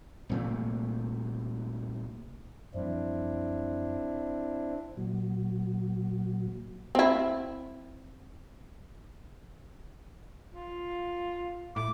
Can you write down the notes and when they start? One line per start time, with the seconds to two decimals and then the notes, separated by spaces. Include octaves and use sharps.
0.29 C2 A#2 A3
2.74 F#2 F3 G3 C4 D4 E4
4.97 A#2 F#3
6.95 C4 E4
10.54 F4
11.76 A2 D6